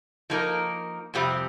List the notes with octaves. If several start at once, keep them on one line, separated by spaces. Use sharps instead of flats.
F3 A#3 D#4 A#4
F2 C3 G3 C4 G4